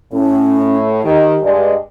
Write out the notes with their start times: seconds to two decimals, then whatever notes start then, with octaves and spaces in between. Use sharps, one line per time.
0.13 A2 C#4
1.03 D#3 G4
1.42 G2 G#3 D5